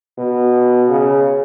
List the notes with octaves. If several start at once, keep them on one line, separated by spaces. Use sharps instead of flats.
B2
C#3